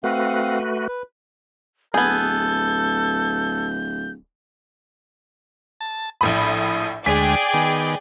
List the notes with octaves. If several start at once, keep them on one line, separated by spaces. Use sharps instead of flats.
A3 C4 F#4 B4 F5 F#5
B4
D1 B3 G#4 A4 G6
A5
A#1 A2 B5 D#6
D2 G#3 G#4 D5 G5 B6
D#3 B3